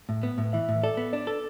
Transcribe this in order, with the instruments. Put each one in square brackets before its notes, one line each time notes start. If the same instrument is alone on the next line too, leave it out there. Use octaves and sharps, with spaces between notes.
[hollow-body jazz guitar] A2
B3
A2
[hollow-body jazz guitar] E3 [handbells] E5
[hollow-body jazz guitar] A2
[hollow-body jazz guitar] A4 [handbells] D5
[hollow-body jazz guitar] B3
[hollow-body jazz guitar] D4 [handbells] D5
[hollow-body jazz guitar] A4